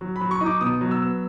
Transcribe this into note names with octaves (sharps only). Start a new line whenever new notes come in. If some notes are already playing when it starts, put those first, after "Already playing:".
F#3
B5
F#3
C#6
D#4
D6
B2 D#6
F#3
E6
B3